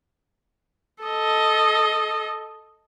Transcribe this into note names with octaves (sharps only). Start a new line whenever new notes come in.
A4 D#5